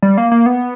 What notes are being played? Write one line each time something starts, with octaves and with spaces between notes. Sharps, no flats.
G3
A#3
A#3
B3